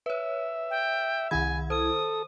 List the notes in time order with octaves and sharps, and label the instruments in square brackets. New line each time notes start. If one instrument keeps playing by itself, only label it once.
[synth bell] B4 C#5 [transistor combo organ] E5
[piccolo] G5
[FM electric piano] C2 E4 G#6 [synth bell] D#3 F#5 B5 [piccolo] G#5
[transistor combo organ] A4 [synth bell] C5 D#7 [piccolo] D#6